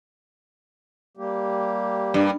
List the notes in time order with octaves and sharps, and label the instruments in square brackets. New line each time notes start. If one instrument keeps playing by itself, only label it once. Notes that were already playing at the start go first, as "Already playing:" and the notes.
[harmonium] G3 A#3 G4
[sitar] G2